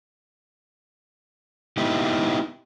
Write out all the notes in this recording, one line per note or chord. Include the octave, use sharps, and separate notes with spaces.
B3 D#4 E4 G4